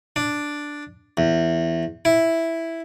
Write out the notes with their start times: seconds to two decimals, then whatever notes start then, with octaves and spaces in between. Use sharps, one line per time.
0.16 D4
1.17 E2
2.05 E4